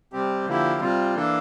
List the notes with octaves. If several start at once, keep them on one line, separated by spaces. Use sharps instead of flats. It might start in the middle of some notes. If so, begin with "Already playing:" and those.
C3 G3 C4 G4
D3 F3 A#3 E4 G4
C3 G3 C4 F4
E3 A#3 D4 A4